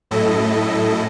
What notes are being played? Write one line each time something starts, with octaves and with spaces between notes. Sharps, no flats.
F#2 A2 E4 A4 D#5